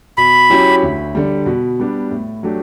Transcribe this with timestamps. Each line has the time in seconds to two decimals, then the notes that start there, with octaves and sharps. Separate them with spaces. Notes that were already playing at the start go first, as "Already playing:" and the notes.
0.17 B2 B5
0.50 F#3 C#4 E4 G4
0.83 D2
1.15 D3 G3
1.46 B2
1.80 G3 B3 D4
2.11 A2
2.43 F#3 A3 D4 G4